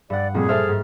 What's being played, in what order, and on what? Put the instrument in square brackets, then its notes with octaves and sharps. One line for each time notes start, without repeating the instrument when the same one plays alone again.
[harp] G2 F#5 [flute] D5
[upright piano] F2 [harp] A#2 G3 [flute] G#4
[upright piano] A4 C5 E5 [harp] F6 A6 C7
[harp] G#2